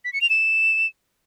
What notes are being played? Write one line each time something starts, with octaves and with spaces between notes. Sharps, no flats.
B6
C#7
F7
E7